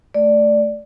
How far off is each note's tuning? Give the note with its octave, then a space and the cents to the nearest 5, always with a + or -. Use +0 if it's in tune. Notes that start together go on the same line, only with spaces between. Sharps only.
A3 +5 D5 +0